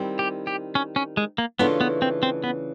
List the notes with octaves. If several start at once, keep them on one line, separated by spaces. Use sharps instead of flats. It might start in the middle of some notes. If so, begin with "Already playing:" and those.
Already playing: D#3 G3 C4 E4
G4
G4
C#4
C#4
G#3
A#3
C#3 E3 A3 B3 D4 F4
B3
C4
C4
B3